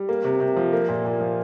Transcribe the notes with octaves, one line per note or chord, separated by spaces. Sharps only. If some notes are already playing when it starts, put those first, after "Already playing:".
Already playing: G3
A#3
C3
C3
F3
A#3
A#2
A#2
F3